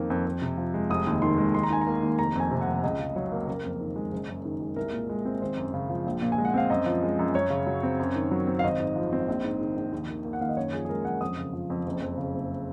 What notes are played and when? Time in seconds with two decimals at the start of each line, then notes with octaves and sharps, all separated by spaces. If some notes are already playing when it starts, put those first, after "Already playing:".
Already playing: F2 D#3 A#3
0.10 F2
0.26 F2
0.42 C3
0.57 F3
0.74 G#3
0.90 F1 D#6
1.07 D#2
1.22 D#3 C6
1.38 G#3
1.54 D#2 C6
1.63 A#5
1.70 D#3 G#5
1.81 A#5
1.87 A#3
2.03 D#2
2.19 F1 A#5
2.35 F2 G#5
2.51 C3
2.61 F#5
2.67 F1
2.83 C#2 D#5
2.99 C#3
3.16 F#3 C#5
3.32 A#3
3.47 F#1 A#4
3.64 F2
3.80 D#3
3.96 G#3
4.12 F#1
4.28 F#2
4.45 D#3
4.61 G#3
4.76 C2 A#4
4.92 A#2
5.09 G#3
5.25 C4
5.41 G#1 C5
5.57 F#2
5.74 C#3
5.90 F3
6.06 A#1
6.22 A#2
6.32 G#5
6.38 G#3
6.45 F#5
6.54 C4 F5
6.70 F#2 D#5
6.86 F3
7.03 G#3
7.19 F#2
7.34 F#2 C#5
7.50 C#3
7.67 F#3
7.83 C4
7.99 F#2
8.15 D#3
8.31 F#3
8.47 C4
8.59 F5
8.64 G#1 D#5
8.80 G#2
8.96 F3
9.13 C4
9.28 A#1
9.44 G#2
9.61 D#3
9.77 A#1
9.92 D#2
10.09 D#3
10.25 A#3
10.33 F#5
10.41 D#2 F5
10.49 D#5
10.57 F#2 C#5
10.73 F3 G#4
10.85 G#4
10.89 G#3 A#4
11.05 F#2 F#5
11.21 F2 D#6
11.38 C#3
11.53 F3
11.70 F2
11.86 F#1
12.02 F2
12.17 C#3
12.34 F#1